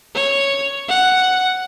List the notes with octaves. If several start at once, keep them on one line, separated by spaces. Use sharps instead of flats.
C#5
F#5